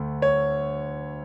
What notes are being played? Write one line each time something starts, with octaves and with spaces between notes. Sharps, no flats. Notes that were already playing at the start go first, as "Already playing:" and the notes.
Already playing: D2 A3
C#5